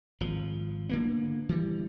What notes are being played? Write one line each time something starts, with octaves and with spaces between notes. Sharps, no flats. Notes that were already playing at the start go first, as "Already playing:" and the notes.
G#1 F3
D3 A#3 B3
E3 G3